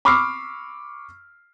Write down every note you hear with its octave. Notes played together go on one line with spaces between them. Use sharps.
B5 C#6 D6 E6 F6 C7